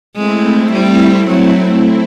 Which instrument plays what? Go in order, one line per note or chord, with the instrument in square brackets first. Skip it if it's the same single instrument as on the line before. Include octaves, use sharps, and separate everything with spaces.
[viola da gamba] G#3 [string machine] A3 C4 E4
[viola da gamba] G3
F#3